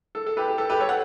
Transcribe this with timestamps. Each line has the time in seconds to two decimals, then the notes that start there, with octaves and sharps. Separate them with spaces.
0.15 A4
0.27 A4
0.37 G4 B4
0.48 G4
0.58 A4
0.69 G4 B4
0.80 A4 C#5
0.89 F#5